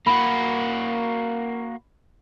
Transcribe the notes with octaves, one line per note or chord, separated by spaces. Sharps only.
A#3 F#4 B5